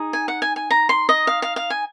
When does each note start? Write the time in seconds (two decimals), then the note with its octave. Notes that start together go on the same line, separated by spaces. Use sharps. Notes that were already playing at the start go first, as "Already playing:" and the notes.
Already playing: D#4 G#4
0.13 G#5
0.28 F#5
0.42 G#5
0.56 G#5
0.71 A#5
0.89 C6
1.09 D#5
1.27 F5
1.42 F5
1.56 F5
1.70 G#5